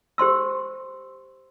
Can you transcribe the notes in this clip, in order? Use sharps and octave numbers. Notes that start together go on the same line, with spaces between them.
G4 C5 C6 E6